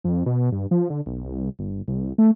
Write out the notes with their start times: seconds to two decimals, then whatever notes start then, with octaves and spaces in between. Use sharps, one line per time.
0.04 F2
0.26 B2
0.52 G2
0.71 F3
0.90 D3
1.06 B1
1.24 C2
1.59 G1
1.88 C2
2.18 A3